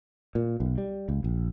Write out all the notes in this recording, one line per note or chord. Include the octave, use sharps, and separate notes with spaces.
A#2
B1
G3
C#2
A#1